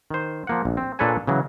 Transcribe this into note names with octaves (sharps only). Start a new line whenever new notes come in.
D#3 C5
F3 A#3 F#5
A#1
C4
A#2 D4 A4 B4 C#5 G#5
C#3 E3 F#3